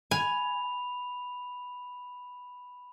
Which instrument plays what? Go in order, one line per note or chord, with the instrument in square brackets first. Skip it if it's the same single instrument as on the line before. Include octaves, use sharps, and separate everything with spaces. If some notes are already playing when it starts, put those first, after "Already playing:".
[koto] G#5 [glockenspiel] B5 F7